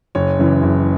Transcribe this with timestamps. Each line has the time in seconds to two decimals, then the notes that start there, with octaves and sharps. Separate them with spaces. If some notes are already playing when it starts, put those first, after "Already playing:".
0.15 F#1 C#5
0.39 F#2 C#3 E3
0.63 F#1